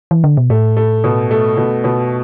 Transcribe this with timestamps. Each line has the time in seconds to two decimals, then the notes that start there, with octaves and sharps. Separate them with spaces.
0.11 E3
0.24 D3
0.37 B2
0.50 A2 A3
0.77 A3
1.04 B2
1.31 A3
1.57 B2
1.84 B2